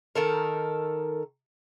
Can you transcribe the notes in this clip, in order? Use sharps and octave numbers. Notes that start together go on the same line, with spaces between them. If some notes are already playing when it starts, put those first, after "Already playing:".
D#3 A4 A#4